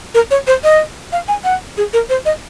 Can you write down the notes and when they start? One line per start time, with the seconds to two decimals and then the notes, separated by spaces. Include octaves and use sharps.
0.14 A#4
0.31 C#5
0.47 C5
0.64 D#5
1.12 F5
1.28 G#5
1.44 F#5
1.77 G#4
1.93 A#4
2.09 C5
2.25 D#5